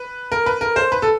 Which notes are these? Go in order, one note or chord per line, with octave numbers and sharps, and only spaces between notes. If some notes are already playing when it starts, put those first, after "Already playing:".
Already playing: B4
A#4
B4
A#4
C5
B4
A4